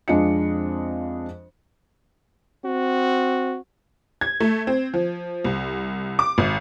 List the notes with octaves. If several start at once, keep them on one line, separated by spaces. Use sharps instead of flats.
F2 G#3 D4 F4 D#5 C#7
C4 F#4
G#6
A3
C4
F3
C2
D6
G#1